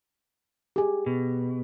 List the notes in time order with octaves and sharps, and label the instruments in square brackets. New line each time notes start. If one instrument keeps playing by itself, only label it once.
[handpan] G4 G#4
[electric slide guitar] B2